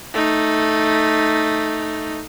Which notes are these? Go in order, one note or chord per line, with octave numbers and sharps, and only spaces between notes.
A3 D#4